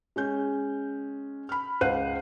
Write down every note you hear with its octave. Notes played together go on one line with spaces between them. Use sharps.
G#3 C#4 G6
B5 F6
C#2 C5 F5 F#5 F#6 D#7